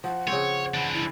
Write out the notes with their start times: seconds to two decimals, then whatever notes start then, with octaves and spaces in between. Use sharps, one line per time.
0.04 F3 F#5
0.28 C#3 C4 C#5
0.74 E3 D4
0.94 E4